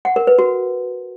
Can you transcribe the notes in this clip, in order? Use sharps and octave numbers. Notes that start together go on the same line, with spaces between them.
F#5
A#4
B4
F#4